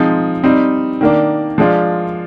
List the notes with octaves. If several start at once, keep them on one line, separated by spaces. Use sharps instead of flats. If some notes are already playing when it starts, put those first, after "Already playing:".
Already playing: F3 G#3 C4 D#4
G3 C4 D#4
D#3 A#3 D4
F3 G#3 D4 F4